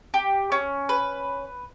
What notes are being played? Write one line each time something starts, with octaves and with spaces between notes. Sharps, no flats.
G4
C#4
B4